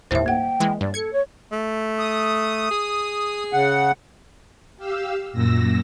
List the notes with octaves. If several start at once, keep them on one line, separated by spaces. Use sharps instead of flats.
G1 D#2 A2 E4 C5 E5
A#3 F#5 G5
E3 G#3
G2 D5
A4 G#6 C#7
C#5
A3
D#6
G#4
C#3 F#5
G4 F5 E6
F#2 A#2 E6 A#6